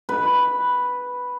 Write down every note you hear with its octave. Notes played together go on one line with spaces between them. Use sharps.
B4